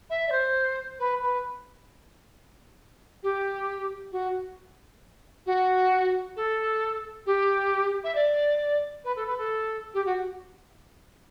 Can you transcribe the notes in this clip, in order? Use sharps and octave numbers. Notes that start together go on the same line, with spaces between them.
E5
D5
C5
B4
B4
G4
F#4
F#4
A4
G4
E5
D5
B4
A4
B4
A4
G4
F#4